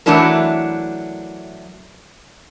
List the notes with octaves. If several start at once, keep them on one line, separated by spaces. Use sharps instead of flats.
E3 F#3 A3 D4 E4 A#4